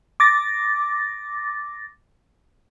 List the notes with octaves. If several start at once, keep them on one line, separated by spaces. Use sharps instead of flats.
D6 A6 A#6